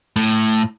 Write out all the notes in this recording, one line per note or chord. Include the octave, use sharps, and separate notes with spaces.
A2